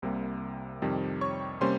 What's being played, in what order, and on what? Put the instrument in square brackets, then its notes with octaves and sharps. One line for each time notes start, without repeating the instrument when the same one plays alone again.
[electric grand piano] C2 C3 G3 A#3
F2 C3 D#3 G3
C#5 C#6
C3 G3 A#3 C#4 C5 C6